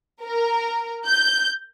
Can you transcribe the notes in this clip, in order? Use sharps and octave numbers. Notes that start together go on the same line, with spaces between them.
A#4
G6